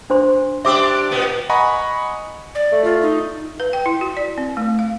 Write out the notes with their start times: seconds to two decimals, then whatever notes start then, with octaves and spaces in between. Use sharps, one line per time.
0.10 D4 C5 C6
0.65 D4 G4 C5 E5 D6 E6
1.11 A#2 B3
1.50 D#5 F#5 G#5 A#5 B5 C#6
2.55 D5
2.72 A3
2.84 F4
3.02 D#4
3.60 B4
3.73 G5
3.86 E4
4.01 F#4
4.17 D5
4.38 C4
4.57 A3
4.79 F5